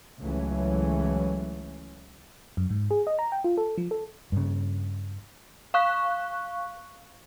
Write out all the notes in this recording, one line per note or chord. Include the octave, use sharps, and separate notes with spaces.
C#2 E3 F#3 A3 C#4
F#2
G#2
G#4
D#5
A#5
G5
F4
A4
F3
A4
G2 C#3
F5 C#6 F#6